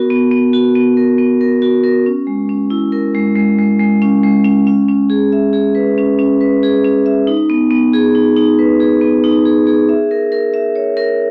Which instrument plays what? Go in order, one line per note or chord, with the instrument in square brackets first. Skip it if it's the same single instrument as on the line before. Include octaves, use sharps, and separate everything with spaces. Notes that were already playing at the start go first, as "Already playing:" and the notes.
Already playing: [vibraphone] B3 F#4 A#4
B3
B3
F#4
B3
A#4
B3
A#4
F#4
A#4
C#4
G#3
C#4
E4
A#4
G#3
G#3
G#3
G#3
C#4
G#3
C#4
C#4
C#4
G#4
E5
G#4
B4
C#4
C#4
B4
G#4
C#4
E5
D#4
B3
B3
G#4
D#4
D#4
B4
G#4
B3
D#4
G#4
G#4
E5
A#4
A#4
E5
C#5
A#4